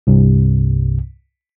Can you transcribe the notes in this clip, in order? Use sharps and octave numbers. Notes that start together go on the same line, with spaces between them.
C2 G2 C3